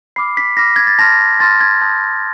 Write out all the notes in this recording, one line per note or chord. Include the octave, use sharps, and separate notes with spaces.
B5 D6 F6 C7
B6
B5 D6 F6 A#6
G#6
A6
A5 C6 F6 A#6
A5 C6 F6 A6
G#6
A5 C6 D#6 G6